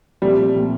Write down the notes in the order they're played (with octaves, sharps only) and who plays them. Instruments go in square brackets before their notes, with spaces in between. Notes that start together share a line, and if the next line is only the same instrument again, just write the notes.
[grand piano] A#2 F3 A3 C4 [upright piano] G3
[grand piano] A#2 F3 A3 C4